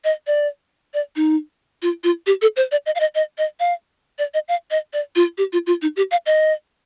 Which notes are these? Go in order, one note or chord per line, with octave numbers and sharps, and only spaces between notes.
D#5
D5
D5
D#4
F4
F4
G4
A4
C5
D5
D#5
F5
D#5
D#5
D#5
F5
D5
D#5
F5
D#5
D5
F4
G4
F4
F4
D#4
G4
F5
D#5